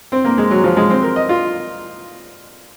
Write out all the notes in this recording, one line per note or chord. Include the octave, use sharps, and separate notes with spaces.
C4
A#3
G#3
F#3
F3
G#3
C4
A#4
D#5
F4